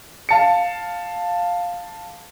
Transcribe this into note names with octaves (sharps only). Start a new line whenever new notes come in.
F5 A5 C#7